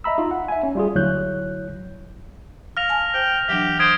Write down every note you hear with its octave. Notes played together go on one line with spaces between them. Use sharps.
D#5 E5 A#5 B5 E6
D#4 F4
F#5
E5 G#5
C#4
G3 F4 G#4
D2 F#3 E4 C#5 F#6 G6
F5 F6 A#6 F7
G#5 A5
C5 G5
E3 F#3 D4 G4
C5 D#6 G#6 D7